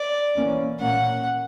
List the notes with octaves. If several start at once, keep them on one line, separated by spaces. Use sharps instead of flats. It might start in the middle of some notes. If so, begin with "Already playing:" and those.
Already playing: D5
E3 A#3 C#4
A#2 A#3 C#4 F#5